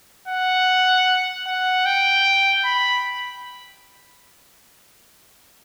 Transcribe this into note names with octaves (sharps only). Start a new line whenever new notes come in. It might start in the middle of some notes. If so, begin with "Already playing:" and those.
F#5
F#5
G5
B5